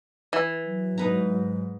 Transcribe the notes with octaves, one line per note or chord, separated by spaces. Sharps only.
E3
F#3
G#2 D#4 B4 A#5